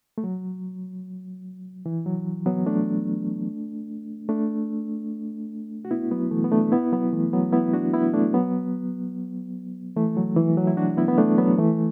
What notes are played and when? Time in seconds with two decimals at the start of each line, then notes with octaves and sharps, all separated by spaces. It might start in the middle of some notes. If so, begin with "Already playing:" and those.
0.18 A3
0.24 F#3
1.86 E3
2.06 F#3
2.46 F#3 B3
2.66 A3 D4
4.29 A3 D4
5.85 F#4
5.91 B3 E4
6.11 F#3 B3
6.31 E3 A3
6.44 B3
6.51 A3 D4
6.72 B3 E4
6.92 F#3 B3
7.13 E3 A3
7.33 F#3 B3
7.53 B3 E4
7.73 D4 F#4
7.93 B3 E4
8.13 A3 D4
8.34 F#3 B3
9.96 E3 A3
10.17 F#3
10.36 E3
10.58 F#3
10.67 E4
10.77 D4 F#4
10.97 B3 E4
11.08 B3
11.18 A3 D4
11.38 F#3 B3
11.59 E3 A3